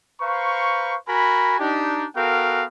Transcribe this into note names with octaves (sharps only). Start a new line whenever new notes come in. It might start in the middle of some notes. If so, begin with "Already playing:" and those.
B4 C5 F5 A#5 C#6
F#4 A#4 G#5 B5
D4 D#4 G4
B3 F#4 A4 A#4 F5 G5